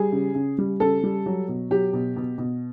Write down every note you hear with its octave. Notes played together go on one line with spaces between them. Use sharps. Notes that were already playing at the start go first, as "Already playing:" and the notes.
Already playing: G3 G#4
C#3
C#3
G3
C#3 A4
G3
F#3
B2
F#3 G4
B2
B2
B2